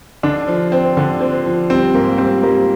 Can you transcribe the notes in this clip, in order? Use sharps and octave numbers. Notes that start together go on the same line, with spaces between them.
D3 D4
F3
C4
D3
C4
F3
G3 C4
G#2 A#3
G3 C4
G3 A#3